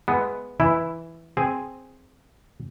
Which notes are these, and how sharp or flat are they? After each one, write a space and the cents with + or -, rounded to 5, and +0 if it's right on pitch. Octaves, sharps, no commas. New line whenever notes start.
G#3 +0 B3 +0 E4 +5
E3 +0 E4 +0
C4 +0 G#4 +0